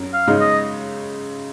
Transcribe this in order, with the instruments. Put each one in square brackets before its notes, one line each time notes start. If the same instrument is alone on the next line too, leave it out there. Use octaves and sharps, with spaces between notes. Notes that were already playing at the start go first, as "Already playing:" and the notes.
Already playing: [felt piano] F#2
[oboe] F5
[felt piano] C#3 G#3 D#4
[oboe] D#5